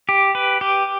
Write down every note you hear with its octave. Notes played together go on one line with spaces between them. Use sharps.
G4
B4
G4